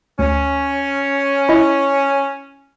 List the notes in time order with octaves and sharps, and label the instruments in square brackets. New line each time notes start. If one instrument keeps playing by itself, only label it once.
[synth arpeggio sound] D2 [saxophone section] C#4
[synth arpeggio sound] E4 D#5